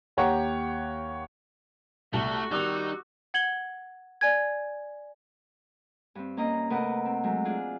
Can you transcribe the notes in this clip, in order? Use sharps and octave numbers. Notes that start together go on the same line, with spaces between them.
D#2 G4 C#5 F#5 G5 A#5
C2 A3 F#4 A5
D#3 G3 D#4 D6 E6 F#6
F#5 G#6 F#7 G7
D5 G#5 G#6
G2 C4
A#3 C#4 D#5 A#5
C3 A3 A#4 B4 D#5 F#5
C4
F#3 G#3 A3
D4 F4 G#4